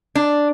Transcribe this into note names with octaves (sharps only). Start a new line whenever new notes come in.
D4